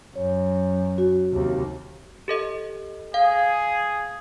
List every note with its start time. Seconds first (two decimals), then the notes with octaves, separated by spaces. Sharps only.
0.16 F#2 C#5
0.98 F#4
1.32 D#2 C3
2.28 G4 A4 D#5
3.14 G#4 F5